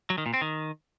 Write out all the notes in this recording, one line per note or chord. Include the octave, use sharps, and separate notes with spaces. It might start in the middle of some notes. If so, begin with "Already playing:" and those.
F#3
D#3
A#2
C4
D#3